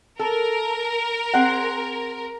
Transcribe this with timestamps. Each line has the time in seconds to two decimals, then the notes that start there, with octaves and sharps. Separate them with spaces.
0.19 A4 A#4
1.33 C4 G#4 F#5